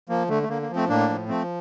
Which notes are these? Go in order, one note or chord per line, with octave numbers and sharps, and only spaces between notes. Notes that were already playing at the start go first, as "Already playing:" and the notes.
F3 A#3
D3 A3
A3
D3 A#3
A#3
F3
A3 C4
A2 A#3 D4
F3
F3 A3 C4